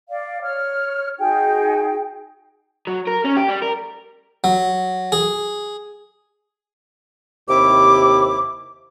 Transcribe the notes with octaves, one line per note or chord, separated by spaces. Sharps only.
D5 F5
C#5 F6
D#4 F#4 G#4 G5
F#3
A#4
C#4
G4
G3
A#4
F#3
G#4
D#2 C3 E4 D6